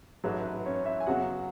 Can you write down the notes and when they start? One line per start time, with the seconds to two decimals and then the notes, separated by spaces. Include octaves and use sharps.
0.24 A1 G#2 F#3 A3 B4
0.45 B4
0.65 C#4 C#5
0.86 E4 E5
1.00 G#5
1.06 F#2 C#3 F#3 B3 F#4 F#5